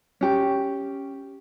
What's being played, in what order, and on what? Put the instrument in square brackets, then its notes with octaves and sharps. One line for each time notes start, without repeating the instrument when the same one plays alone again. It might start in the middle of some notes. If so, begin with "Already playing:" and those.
[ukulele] C#4 G4